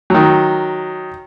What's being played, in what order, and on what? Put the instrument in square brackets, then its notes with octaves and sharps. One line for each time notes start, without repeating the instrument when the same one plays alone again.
[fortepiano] D#3 F#3